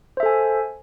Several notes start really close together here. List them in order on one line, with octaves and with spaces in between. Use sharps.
C5 E5 A4 G#5